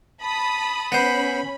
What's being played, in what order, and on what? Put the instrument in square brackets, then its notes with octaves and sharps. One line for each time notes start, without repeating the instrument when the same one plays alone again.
[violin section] A5 B5 D#6
[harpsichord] B3 C5 [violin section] C#4 B5